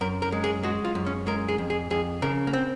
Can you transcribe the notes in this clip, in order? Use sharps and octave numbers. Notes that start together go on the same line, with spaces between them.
F#2 A#4
A#4
G#3
G#4
G#3 F#4
F4
F#2
C#4
G#3 A#4
G#4
F2
G#4
F2 G#4
C#3 A#4
A#3
C4